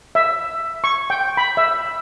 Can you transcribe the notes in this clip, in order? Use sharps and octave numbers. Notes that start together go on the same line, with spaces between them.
E5
C#6
G5
B5
E5